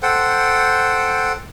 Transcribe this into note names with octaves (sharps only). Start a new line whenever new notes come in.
A4 C5 F#5 G5